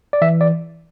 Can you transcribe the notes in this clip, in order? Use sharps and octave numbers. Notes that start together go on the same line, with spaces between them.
D5
E3 E5
D5